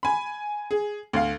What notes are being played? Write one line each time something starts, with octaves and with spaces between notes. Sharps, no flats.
G#5 B5
G#4
D2 F5